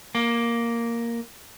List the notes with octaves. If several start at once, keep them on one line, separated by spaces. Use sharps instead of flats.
A#3